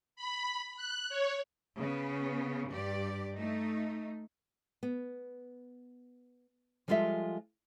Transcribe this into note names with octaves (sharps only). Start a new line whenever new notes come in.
B5
F#6
C#5
C#3 B3
G2 G4 D5
A3 D#4
B3
F3 G3 G#3 F4 A4 E5